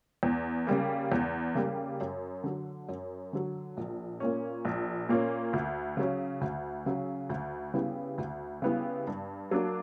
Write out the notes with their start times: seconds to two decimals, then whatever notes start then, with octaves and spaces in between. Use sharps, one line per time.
0.23 E2
0.67 C#3 G3 A#3
1.12 E2
1.55 C#3 G3 A#3
2.01 F#2
2.44 D3 F#3
2.89 F#2
3.33 D3 F#3
3.77 A#1
4.20 A#2 A#3 C#4
4.65 A#1
5.09 A#2 A#3 C#4
5.53 D2
5.97 C#3 F#3 C#4
6.41 D2
6.85 C#3 F#3 C#4
7.29 D2
7.74 C#3 G3 B3 E4
8.18 D2
8.62 C#3 G3 B3 E4
9.07 G2
9.51 F#3 A#3 D4